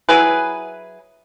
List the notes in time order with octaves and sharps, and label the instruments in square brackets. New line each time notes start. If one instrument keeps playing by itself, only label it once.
[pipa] F#3 E4 G#4 B4